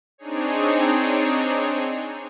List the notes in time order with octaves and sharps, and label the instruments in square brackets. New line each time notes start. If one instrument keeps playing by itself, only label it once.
[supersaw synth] C4 D4 D#4 G#4 C#5